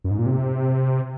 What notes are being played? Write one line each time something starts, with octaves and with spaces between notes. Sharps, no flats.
F#2
G#2
A#2
C3